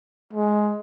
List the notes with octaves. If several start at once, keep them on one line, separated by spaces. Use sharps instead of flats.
G#3